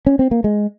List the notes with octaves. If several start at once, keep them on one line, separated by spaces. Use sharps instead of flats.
C#4
C4
A#3
G#3